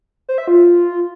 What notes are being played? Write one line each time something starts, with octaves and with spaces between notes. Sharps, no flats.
C5
E5
F4